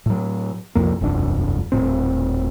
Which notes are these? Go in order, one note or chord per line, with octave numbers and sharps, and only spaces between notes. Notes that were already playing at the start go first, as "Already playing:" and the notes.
A2 F#3
C2 F2 A#3
E1 C2 F#2 D4
D#1 B1 A2 C4